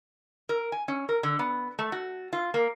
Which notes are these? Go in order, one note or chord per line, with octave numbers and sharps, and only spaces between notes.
A#4
G#5
C#4
A#4
D3
B3
A3
F#4
F4
A#3